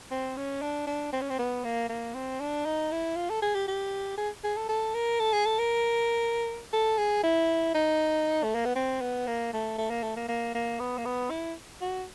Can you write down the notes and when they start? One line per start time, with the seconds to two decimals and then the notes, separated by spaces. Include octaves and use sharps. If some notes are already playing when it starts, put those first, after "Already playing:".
0.11 C4
0.37 C#4
0.62 D4
0.87 D4
1.13 C4
1.21 C#4
1.30 C4
1.39 B3
1.64 A#3
1.89 A#3
2.14 C4
2.40 D4
2.65 D#4
2.91 E4
3.16 F4
3.30 A4
3.42 G#4
3.55 G4
3.67 G4
4.18 G#4
4.44 G#4
4.57 A4
4.69 A4
4.94 A#4
5.20 A4
5.33 G#4
5.46 A4
5.59 A#4
6.73 A4
6.98 G#4
7.23 E4
7.74 D#4
8.43 A3
8.55 A#3
8.65 B3
8.75 C4
9.01 B3
9.27 A#3
9.53 A3
9.78 A3
9.90 A#3
10.03 A3
10.16 A#3
10.28 A#3
10.55 A#3
10.79 B3
10.98 A#3
11.05 B3
11.30 E4
11.81 F#4